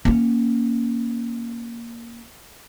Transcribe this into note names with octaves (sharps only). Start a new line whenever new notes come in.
A#3 C#4